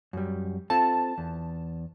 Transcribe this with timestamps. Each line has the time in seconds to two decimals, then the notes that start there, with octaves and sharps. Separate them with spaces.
0.13 F#2 G3
0.70 C4 F4 A4 A5
1.18 E2